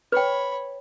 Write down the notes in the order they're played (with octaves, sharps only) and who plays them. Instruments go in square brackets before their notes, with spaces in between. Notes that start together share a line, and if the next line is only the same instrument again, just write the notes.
[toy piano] B4 G5 [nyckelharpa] C#5 B5